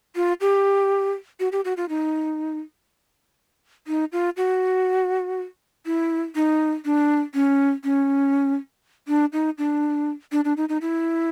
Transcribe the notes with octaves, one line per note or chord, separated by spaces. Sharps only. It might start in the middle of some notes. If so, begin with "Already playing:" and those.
F4
G4
F#4
G4
F#4
F4
D#4
D#4
F4
F#4
E4
D#4
D4
C#4
C#4
D4
D#4
D4
D4
D4
D#4
D#4
E4